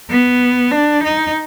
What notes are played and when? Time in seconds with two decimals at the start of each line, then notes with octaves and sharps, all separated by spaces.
0.11 B3
0.71 D4
1.04 D#4